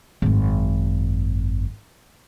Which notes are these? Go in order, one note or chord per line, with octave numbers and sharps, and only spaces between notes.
G#1 F#2